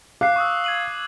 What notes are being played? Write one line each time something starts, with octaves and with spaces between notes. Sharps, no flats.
F5 D6 F#6 C7
C#6 D#6 E6
G#6 D#7 F#7